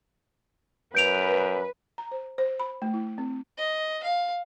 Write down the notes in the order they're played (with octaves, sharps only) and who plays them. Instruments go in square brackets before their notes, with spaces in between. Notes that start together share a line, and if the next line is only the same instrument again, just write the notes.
[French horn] F#2 [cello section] B4 [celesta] G6 D7 F7
[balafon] A#5
C5
C5
B5
A3
E4
C4
[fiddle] D#5
F5